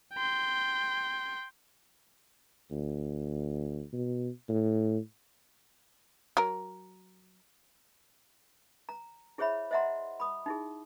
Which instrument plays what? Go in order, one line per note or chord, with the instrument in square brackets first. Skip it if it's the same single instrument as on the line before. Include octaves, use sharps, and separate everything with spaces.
[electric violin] G5 C6
[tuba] D2
B2
A2
[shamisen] F#3 A#4
[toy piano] A#5
E4 G#4 C5 C#5 E5 B5
C5 D#5 E5 F#5 A#5 C6
B5 D#6
D#4 E4 G#4